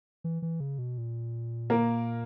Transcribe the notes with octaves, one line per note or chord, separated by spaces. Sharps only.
E3
E3
C#3
B2
A#2
A#3 A#4